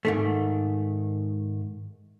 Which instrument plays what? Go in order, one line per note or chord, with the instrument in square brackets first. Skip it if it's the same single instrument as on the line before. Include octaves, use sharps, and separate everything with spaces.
[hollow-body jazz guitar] G#2 D#3 A3